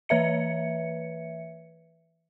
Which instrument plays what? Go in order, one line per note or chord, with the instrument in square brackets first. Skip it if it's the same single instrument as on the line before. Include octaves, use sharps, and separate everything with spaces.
[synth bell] E3 B4 E5 C#7